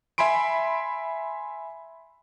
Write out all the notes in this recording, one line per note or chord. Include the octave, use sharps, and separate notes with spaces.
E5 G#5 B5 C6 D7